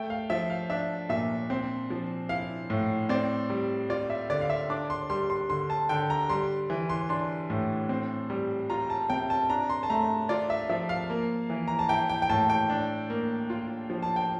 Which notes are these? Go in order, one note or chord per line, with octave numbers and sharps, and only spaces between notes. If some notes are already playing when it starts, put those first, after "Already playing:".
Already playing: A3 G5
F5
F3 E5
F5
D4 E5
A#2 E5
C4
F3
E4 F5
A2
C4 D5
G3
F4 D5
E5
D3 D5
F5
E5
D4 D6
C6
G3 C6
C6
D3 C6
A5
D3 G5
A#5
G3 C6
E3
C6
D4 C6
A2
C4
G3
F4 A#5
A5
C3 G5
A5
D4 A#5
C6
A5
A3 A#5
F4 D5
E5
F3 E5
F5
A#3
E3
A#5
A5
E4 G5
G5
G5
A2 A5
G5
D4
A#3
F4
F3
A5
G5